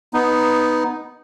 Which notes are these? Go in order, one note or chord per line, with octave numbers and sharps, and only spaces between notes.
B3 D#4